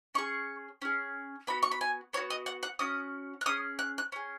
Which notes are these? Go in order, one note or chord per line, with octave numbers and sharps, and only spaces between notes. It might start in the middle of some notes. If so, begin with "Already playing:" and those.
C#4 G#4 C#6
C#4 G#4
B3 F#4 B5
C#6
B5
G#5
B3 F#4 C#5
D#5
F#5
F#5
C#4 F#4 D#6
F#6
C#4 G#4 D#6
F#6
F#6
C#4 G#4